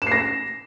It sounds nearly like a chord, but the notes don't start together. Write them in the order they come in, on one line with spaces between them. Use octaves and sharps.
E7 C7 A#6